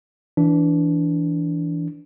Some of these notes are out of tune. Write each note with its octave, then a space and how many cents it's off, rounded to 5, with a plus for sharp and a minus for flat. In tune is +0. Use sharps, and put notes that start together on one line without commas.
E3 +0 D4 -20